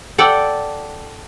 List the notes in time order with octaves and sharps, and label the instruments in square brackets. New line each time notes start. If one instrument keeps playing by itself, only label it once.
[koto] A4 D5 F#5 G5